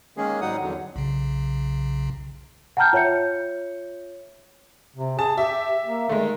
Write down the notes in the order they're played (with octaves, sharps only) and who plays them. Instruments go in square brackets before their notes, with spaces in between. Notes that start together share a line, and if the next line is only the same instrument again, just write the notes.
[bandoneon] D#3 G#3 A#3 C#4 G#4
G#2 F#3 G3 D#4 F#5 D#6
E2 D3 F#3
[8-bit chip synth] B1 C#3
[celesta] F#5 G5 A5 A#5 F6 G6
F4 C#5 E5 G6 C#7
[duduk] C3
[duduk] G#4 [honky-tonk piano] A5
[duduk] G4 [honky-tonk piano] E5
[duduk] A#3
[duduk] D#3 [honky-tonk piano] G#3 A3